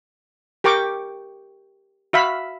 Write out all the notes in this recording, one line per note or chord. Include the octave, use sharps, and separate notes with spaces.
G4 A#4 G5 C#6 D6
F#4 E5 F5 B5